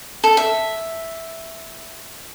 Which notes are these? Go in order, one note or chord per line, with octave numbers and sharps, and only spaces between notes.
A4
E5